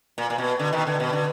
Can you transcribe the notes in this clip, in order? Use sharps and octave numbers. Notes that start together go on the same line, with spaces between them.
A#2
A#2
B2
D3
B2 D#3
D3
B2
D3